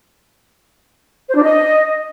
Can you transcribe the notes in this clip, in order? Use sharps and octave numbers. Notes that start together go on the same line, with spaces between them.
C5
D4
D#5